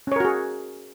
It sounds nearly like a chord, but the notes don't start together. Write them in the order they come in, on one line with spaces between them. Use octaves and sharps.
C#4 C#5 A#4 F#4 G#4